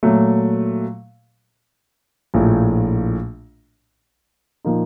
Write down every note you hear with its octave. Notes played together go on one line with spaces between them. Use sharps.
A#2 F#3 A3
A#1 A2 F3 A3
A#2 F3 A#3 D#4